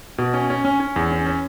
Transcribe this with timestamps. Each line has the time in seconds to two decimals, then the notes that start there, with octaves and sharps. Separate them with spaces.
0.18 B2
0.34 C#4
0.50 C#4
0.65 C#4
0.80 C#4
0.96 E2
1.11 C#4
1.26 C#4